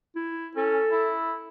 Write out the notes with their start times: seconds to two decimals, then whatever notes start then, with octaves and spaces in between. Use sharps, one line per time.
0.16 E4
0.57 C#4 A4
0.91 E4